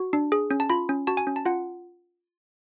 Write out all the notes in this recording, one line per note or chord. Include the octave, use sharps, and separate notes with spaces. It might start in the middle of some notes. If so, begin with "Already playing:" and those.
Already playing: F#4
D4
G#4
C#4
A5
F4 B5
C#4
F#4 A5
G#5
C#4
A5
F4 F#5